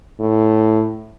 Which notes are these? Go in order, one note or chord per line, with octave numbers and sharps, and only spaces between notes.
A2